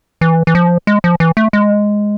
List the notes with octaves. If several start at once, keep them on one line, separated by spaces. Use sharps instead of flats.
E3
E3
F3
G#3
F3
E3
A3
G#3